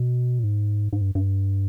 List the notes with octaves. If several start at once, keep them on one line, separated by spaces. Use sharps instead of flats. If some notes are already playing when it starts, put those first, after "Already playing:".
Already playing: B2
A#2
G#2
G#2
G2
G2